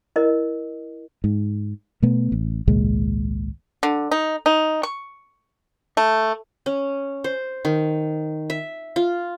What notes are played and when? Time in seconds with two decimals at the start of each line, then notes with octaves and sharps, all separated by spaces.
0.16 E4 A#4 D#5
1.24 G#2
2.02 B2 A3 B3
2.32 A1
2.67 G#1 C#2 A#2 G#3
3.83 D3
4.11 D#4
4.46 D#4
4.83 C#6
5.97 A3
6.66 C#4
7.24 C5
7.65 D#3
8.50 E5
8.96 F4